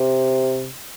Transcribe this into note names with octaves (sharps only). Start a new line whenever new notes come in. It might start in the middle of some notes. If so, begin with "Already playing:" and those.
Already playing: C3